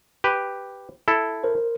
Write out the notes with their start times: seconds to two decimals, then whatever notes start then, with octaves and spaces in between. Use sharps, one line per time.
0.24 G4 B4
1.08 E4 A4
1.44 A#4 C5